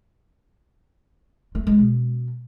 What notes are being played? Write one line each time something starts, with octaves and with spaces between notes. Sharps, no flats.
A3
G#3
B2